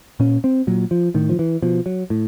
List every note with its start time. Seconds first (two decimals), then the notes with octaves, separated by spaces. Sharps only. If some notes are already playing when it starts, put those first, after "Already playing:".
0.20 A#2 C#4
0.44 C4
0.67 A#2 F#3
0.91 F3
1.14 A2 D#3
1.29 F3
1.39 E3
1.62 B2 F3
1.86 F#3
2.10 A2